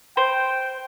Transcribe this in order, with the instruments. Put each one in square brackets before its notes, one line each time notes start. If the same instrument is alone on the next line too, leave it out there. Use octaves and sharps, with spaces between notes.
[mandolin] C5 [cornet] G5